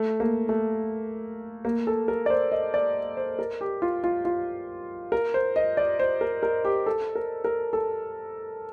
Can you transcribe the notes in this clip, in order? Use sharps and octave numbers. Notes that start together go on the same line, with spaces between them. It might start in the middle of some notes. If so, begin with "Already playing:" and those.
Already playing: A3
A#3
A3
A#3
A4
A#4
D5
C5
D#5
D5
C5
A#4
G4
F4
F4
F4
A#4
C5
D#5
D5
C5
A#4
A#4
G4
A4
A#4
A#4
A4